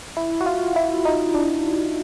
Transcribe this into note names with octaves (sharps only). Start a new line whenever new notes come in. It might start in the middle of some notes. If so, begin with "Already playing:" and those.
E4
F#4
F4
E4
D#4
D4